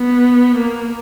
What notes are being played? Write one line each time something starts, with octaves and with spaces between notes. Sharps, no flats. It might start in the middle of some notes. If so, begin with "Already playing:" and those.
Already playing: B3
A#3